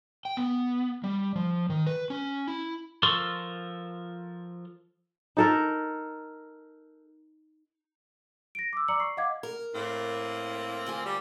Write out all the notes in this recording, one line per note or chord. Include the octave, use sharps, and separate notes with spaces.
G5
B3
G3
F3
D#3
B4
C#4
E4
F3 A4 A#4 C6 C#6
D#4 A4 A#4
A#6 D7
D6 E6
D5 A#5 D6 E6 C#7 F#7
C#6 C7
D#5 F5 F#5 D6 G#6
A#4
A2 A#3 C4
D2 F4 G#5
G3